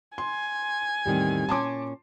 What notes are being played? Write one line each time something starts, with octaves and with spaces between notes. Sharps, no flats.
G#5 C6
E2 A2 D#3 G3 C4
A#2 C#4 A5 C6 D6